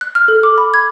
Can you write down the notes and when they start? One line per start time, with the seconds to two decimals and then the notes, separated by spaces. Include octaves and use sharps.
0.01 F#6
0.15 F6
0.28 A4
0.43 D6
0.58 B5
0.74 G#6